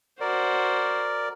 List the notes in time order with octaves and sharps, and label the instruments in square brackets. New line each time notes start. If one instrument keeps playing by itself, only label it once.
[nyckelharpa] F#4 C5 [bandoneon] A#4 D5